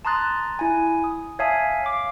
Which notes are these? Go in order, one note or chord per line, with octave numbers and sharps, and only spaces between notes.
A5 A#5 C6 D#6 F#6 A6
E4 G#5
D#6
C#5 E5 F5 G#5 A5 D#6
F5 D6